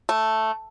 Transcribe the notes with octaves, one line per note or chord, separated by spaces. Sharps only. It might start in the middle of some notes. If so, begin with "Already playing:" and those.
A3